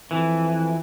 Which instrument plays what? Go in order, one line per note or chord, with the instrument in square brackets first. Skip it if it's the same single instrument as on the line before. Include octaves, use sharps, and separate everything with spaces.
[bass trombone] F2 [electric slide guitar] E3